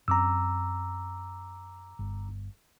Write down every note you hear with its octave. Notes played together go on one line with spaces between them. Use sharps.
F#2 C4 C#4 A#5 D6 E6
G1